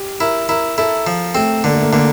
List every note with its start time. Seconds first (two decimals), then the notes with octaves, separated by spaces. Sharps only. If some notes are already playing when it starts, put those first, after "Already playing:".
Already playing: G4
0.20 E4 A#4
0.49 E4 A#4
0.78 E4 A4
1.07 F3
1.35 A3 C4
1.64 D3 A#3
1.74 A3
1.82 A#3
1.93 D3 A#3